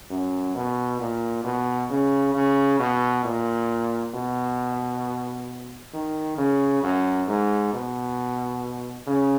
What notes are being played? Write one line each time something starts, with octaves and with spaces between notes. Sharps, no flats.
F#2
B2
A#2
B2
C#3
C#3
B2
A#2
B2
D#3
C#3
F#2
G#2
B2
C#3